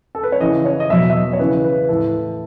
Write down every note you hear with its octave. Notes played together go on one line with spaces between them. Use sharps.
A4
B4
C#5
C#3 E3 D#5
C#5
D#5
B2 F#3 E5
E5
D#5
C#5
C#3 E3 B4
B4
A2 E3 A4